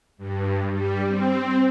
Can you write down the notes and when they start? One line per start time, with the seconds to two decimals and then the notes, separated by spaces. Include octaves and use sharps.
0.18 G2
0.71 G3
1.08 C4